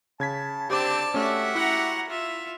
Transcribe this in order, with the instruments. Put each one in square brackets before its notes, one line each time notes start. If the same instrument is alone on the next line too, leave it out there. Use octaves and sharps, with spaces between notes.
[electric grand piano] C#3 G#6 B6 [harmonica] A5
[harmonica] D3 C4 [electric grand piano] G4 C5 D6 [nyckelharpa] D5 A5
[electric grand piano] A3 C#4 [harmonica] F#4 G4 E5
[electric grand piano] E4 [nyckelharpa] F#5 A#5
[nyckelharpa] F4 E5